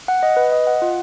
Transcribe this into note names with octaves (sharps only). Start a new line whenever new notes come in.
F#5
D#5
B4
D#5
F#5
F4